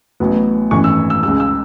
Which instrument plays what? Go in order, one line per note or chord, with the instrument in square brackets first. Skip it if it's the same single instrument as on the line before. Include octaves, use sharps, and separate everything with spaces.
[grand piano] A1 A2 F#3 B3
G#1 F#2 E3 A3 C#6
E6
E6
C#2 C#3 G#3 E6
E6